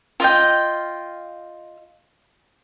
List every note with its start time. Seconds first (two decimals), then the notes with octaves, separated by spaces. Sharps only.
0.20 F4 D#5 G5